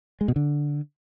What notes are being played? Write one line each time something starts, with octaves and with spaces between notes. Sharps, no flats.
G#3
B2
D3